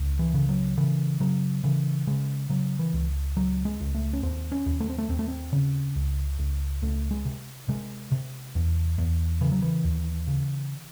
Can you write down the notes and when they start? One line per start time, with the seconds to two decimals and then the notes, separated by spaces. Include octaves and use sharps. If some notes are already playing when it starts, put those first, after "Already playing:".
Already playing: C#2
0.19 E3
0.34 C#3
0.49 F#3
0.78 C#3 E3
1.20 C#3 F#3
1.64 C#3 E3
2.07 C#3 G#3
2.50 C#3 F#3
2.79 E3
2.94 C#2
3.37 C#2 F#3
3.65 G#3
3.80 C#2
3.95 A3
4.13 C#4
4.23 D#2 C4
4.52 C#4
4.66 D#2
4.80 A3
4.90 C4
4.98 A3
5.09 D#2 C4
5.19 A3
5.28 C4
5.53 C#3
5.96 C#2
6.39 C#2
6.82 C#2 A3
7.11 G#3
7.25 C3
7.69 C3 G#3
8.12 C3
8.55 E2
8.98 E2
9.41 C#3 E3
9.52 F#3
9.62 E3
9.84 D#2
10.27 C#3